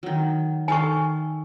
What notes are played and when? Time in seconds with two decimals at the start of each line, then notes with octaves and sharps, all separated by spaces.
0.03 D#3 F#3
0.68 D#3 A4 F5 G#5 C#6